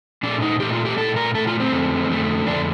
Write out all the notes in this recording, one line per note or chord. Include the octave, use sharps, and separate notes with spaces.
A#2 A3 D4
D#4
A#2 A3 G4
F4
G4
A#2 A3 A4
A#4
A#2 A3 A4
F4
C4
F2 D3 A3
F2 D3 A3
F2 D3 A3 D4